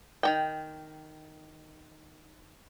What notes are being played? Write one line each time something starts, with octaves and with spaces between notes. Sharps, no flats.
D#3 F#4 G5